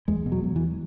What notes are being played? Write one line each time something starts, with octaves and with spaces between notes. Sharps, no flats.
E2 G#3
B2
F#3
E2
E3